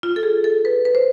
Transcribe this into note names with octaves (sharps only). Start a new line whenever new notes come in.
F4
A4
G#4
A4
B4
B4
C5